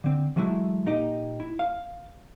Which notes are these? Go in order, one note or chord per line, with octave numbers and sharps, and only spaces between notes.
D3 C4
E3 F#3 G#3 A3 E4
A#2 D#4 G4 D#5
E4
F5